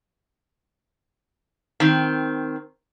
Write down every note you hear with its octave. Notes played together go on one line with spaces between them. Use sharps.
D#3 C4